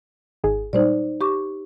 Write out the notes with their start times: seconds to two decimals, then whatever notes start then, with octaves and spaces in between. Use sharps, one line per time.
0.44 G#1 D#4 G#4
0.73 A#2 G3 G#3 D#4 C5 D5
1.21 G4 C#6 D6